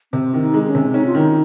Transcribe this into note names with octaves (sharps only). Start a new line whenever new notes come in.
C3 C4
D#3
D#4
G#3
C#4
C3
C#4 D#4
F4
D#3 D#4